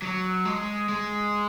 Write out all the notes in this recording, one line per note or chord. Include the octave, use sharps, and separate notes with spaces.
F#3
G#3
G#3